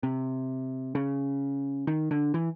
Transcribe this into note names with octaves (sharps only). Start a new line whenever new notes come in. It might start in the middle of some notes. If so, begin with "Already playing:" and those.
C3
C#3
D#3
D3
E3